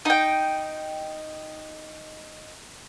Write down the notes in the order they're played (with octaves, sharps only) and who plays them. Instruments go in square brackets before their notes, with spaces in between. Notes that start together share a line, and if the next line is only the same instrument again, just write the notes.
[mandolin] D#4 G5